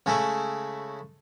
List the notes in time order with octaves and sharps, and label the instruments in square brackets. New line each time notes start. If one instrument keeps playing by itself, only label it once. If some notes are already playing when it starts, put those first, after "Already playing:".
[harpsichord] C#3 G#3 A3 E4